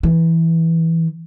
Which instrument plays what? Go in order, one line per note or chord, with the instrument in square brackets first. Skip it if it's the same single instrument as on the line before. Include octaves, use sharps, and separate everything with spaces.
[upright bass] E3